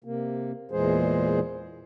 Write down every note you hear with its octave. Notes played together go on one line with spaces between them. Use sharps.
C3 A#3
E2 A#2 E3 G#3 G#4 C5